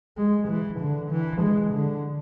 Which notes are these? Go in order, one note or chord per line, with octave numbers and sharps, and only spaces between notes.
G#3
E3
D3
E3
G#3
D3